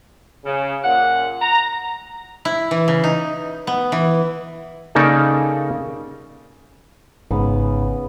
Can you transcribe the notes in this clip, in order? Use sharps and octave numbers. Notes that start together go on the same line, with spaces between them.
C#3
A#2 F#5
A#5
E4
E3
C#3
D#4
B3
E3
C#3 A#3 D#4 A4 D5
G#1 G#2 C#3 B3